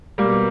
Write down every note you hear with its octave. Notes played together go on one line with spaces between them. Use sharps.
B2 G3 A#3